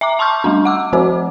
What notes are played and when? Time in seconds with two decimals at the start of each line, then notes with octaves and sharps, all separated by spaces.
0.01 E5 A#5 D6
0.19 A5 C6 C#6 F6 G6
0.44 G3 A3 D4
0.65 F#5 D6 E6
0.93 F3 C4 F#4 C5